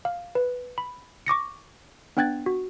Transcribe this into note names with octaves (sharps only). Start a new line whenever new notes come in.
F5
B4
B5
C#6 D6 A#6 C#7
B3 D4 G5 F#6 G#6 A6
F#4